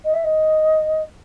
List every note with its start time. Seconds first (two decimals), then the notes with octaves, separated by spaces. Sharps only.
0.04 D#5
0.13 E5
0.23 D#5